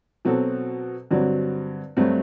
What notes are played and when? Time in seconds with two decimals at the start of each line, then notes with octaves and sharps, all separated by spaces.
0.25 B2 F#3 C4 F#4 A4
1.11 G2 D3 F#3 C4 F#4
1.97 G2 F#3 A3 C4 F#4